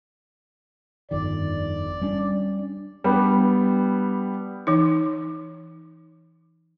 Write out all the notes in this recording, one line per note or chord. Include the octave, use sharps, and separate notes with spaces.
G1 F2 D#3 D5
G3 C#4 D4
G3 B3 D4
E3 D#4